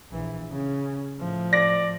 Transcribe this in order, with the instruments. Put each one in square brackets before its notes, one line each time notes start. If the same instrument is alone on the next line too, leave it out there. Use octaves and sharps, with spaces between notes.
[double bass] A#1 E3
C#3 C#4
A2 F3
[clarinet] D5 [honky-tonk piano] A#6